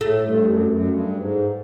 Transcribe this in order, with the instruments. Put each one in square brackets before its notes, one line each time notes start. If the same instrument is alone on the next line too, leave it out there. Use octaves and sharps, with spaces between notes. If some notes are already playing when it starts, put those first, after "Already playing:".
[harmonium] A2 [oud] A3
[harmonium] G2
F#2
F#2
G2
G#2